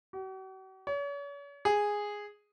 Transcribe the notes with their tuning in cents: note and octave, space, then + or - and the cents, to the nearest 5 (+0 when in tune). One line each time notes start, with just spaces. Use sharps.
F#4 +45
C#5 +40
G#4 -5